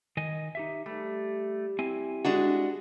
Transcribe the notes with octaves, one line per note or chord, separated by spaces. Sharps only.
D#3 D#5 G#5
D#4 G4 E5
G3 A3
C4 E4 G#5
G#3 D4 F#4